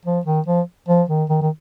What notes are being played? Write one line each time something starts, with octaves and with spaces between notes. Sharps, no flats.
F3
D#3
F3
F3
D#3
D#3
D#3